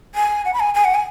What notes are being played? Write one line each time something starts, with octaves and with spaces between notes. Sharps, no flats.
G#5
F#5
B5
G#5
G#5
F#5
G#5